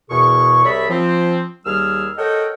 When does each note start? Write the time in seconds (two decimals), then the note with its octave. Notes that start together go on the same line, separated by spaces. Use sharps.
0.09 E2 B2 G#4 A#4 C#6
0.64 C2 G#4 C#5 D5 E5 B5
0.89 F3 C4
1.66 D#2 G3 G#4 E6 F6
2.18 A4 A#4 C#5 D#5 F#5 G5